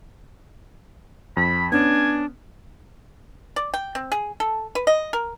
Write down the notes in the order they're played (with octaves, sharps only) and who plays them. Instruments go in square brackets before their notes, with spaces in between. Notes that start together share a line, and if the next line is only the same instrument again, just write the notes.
[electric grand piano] F2 [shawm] B5
[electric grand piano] B3 C#4 [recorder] D4 [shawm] G#5
[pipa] D5
G5
C4
G#4
A4
B4
D#5
A#4